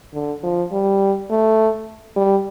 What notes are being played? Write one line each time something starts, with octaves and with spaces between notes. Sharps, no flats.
D3
F3
G3
A3
G3